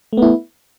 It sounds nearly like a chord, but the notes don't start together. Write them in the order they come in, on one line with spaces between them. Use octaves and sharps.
A3 B3 E4